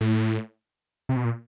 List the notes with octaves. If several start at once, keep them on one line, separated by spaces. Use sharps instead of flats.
A2
C3
B2
A#2